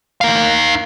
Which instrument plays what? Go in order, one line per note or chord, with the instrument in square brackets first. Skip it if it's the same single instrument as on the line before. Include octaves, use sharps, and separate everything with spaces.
[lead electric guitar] D#4 F5